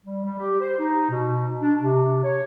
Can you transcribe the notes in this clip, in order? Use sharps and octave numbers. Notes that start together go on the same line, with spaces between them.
G3
G3
G4
C5
D#4
B2
D4
C3
C#5